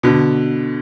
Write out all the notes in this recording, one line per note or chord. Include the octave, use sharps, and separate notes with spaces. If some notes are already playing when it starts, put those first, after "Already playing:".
B2 D3